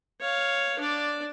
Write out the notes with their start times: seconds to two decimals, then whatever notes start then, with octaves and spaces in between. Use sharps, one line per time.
0.20 C#5 F5
0.79 D4 D5